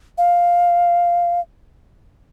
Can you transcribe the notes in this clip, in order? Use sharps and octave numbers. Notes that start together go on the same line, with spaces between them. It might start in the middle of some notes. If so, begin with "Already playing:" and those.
F5